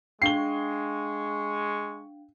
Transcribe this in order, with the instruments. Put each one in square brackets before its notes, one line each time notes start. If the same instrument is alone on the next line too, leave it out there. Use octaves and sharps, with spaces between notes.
[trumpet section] G#3 C#6 [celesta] D4 F5 G5 [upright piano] C7 G7